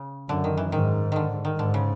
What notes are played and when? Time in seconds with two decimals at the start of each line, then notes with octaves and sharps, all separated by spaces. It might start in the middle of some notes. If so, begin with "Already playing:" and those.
Already playing: C#3
0.29 F#2 D3
0.44 D#3
0.57 E3
0.72 G#2 D#3
1.12 D3 D#3
1.45 D#3
1.59 G#2 D3
1.74 C#3